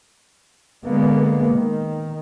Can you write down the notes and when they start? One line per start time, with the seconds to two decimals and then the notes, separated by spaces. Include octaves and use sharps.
0.84 D3 G#3 A#3 B3
1.53 D#3